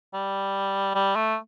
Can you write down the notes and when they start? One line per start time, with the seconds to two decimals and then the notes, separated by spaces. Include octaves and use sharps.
0.14 G3
0.94 G3
1.15 A3